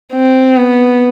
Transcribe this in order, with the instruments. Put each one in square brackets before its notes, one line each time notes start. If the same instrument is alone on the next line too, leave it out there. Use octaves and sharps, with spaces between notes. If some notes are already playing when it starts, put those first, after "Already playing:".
[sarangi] C4
B3